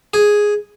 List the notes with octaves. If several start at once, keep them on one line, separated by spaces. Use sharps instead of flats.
G#4